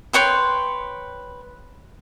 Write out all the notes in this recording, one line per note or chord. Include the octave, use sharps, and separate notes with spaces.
B4 C#5 G5 C6